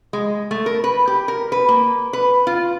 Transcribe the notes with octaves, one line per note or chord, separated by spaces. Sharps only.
G#3
A3
A#4
B4
G4
A#4
B4
A#3
B4
F4